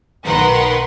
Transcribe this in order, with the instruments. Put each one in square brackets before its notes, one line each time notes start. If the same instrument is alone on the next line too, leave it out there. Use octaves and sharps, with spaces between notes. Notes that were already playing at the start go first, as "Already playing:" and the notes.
[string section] B1 D#3 A#4 B4 F#5 C6